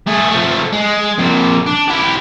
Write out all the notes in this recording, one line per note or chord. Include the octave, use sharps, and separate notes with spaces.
A3 G#4
F3 A3
G#3
F2 A#2
D4
E4 G4